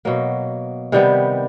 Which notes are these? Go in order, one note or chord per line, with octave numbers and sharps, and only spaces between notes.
B2 F#3 A#3
C3 D#3 G3 B3